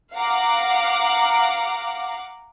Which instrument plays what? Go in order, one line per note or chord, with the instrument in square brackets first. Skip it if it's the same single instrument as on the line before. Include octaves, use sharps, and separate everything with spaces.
[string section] F5 F#5 A#5 D6